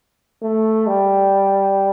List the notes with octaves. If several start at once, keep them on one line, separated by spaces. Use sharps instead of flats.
A3
G3